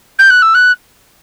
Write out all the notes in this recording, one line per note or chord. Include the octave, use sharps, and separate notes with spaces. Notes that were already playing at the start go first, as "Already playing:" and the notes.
G6
F#6
E6
F#6